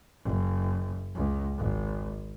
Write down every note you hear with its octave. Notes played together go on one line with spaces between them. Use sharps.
F#1
C#2
G#1